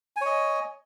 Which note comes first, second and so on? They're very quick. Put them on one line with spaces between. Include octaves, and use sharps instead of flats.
G#5 C#5 D#5